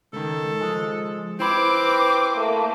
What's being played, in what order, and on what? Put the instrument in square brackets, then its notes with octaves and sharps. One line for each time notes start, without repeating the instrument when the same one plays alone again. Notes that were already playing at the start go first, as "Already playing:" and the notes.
[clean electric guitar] C#2 D#3 [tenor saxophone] A4
[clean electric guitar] F3 G#3
[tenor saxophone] C4 [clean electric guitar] E4 B5 [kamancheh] B4 D6
[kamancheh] A3 A#3